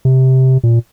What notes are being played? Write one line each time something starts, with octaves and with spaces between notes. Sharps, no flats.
C3
A#2